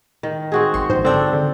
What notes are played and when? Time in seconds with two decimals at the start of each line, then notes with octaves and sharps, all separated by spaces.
0.23 D#3
0.52 C4 F#4 G#4
0.74 G#1 C6 C#6
0.90 A#1 G#2 C5
1.05 D3 C4 D4 A4 E6
1.33 D3